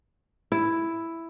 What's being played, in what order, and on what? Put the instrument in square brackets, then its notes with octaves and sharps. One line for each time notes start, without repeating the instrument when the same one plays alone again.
[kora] E4